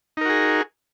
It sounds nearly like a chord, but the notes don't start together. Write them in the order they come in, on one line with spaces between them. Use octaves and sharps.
D#4 A#4 F#4 G#4